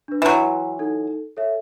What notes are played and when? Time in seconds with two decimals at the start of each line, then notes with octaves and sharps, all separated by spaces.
0.08 D4 B4
0.22 E3 F#3 B4 C6
0.79 D#4 A4
1.37 A4 C#5 E5